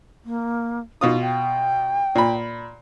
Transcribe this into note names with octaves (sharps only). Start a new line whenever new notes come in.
A#3
B2 D#4 F4 D#6
G5
A#2 B5